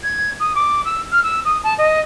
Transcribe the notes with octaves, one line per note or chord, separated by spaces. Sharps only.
G#6
D#6
D6
E6
F6
E6
D#6
A5
D#5